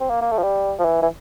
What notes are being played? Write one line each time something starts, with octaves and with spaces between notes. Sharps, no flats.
C4
A#3
A#3
A3
F3
G3
F3
E3
E3